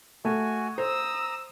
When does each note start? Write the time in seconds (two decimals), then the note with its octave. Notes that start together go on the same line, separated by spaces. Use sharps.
0.25 A3 F#4 G#5
0.78 C5 A#5 D#6 E6